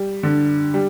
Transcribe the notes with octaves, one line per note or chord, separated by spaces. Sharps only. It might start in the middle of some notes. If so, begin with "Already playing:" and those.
Already playing: G3
D3
G3